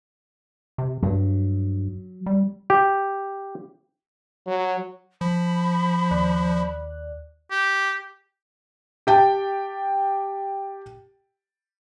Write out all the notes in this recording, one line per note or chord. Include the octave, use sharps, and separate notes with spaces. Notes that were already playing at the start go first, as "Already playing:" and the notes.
C3
G2 F#3
G3
G4
F#3
F3 B5
D#2 D5 F#6
G4
G4 G5 A5